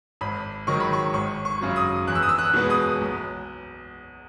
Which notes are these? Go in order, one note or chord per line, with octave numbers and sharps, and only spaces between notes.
G#1 B5
G#2 D#3 F#3 C#6
B5
C#6
G#1 C#6
C#6
F#2 C#3 F#3
D#6
E2 F#6
E6
D#6
E6
F#6
B2 G#3 B3
D#6
B1